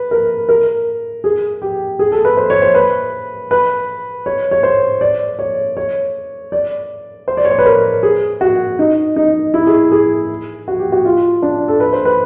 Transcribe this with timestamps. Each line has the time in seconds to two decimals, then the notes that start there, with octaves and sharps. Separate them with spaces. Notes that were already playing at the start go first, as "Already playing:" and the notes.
Already playing: B4
0.11 A#4
0.49 A#4
1.24 G#4
1.62 G4
1.99 G#4
2.12 A4
2.25 B4
2.37 C5
2.50 C#5
2.62 C5
2.75 B4
3.51 B4
4.26 C#5
4.51 C#5
4.63 C5
5.01 D5
5.39 C#5
5.77 C#5
6.52 D5
7.28 C5
7.37 D5
7.45 C#5
7.51 C5
7.59 B4
7.66 A#4
8.03 G#4
8.41 F#4
8.79 D#4
9.16 D#4
9.54 E4
9.67 G#4
9.92 G#4
10.68 F#4
10.79 G4
10.92 F#4
11.05 F4
11.42 D4
11.68 A4
11.80 B4
11.93 C5
12.05 B4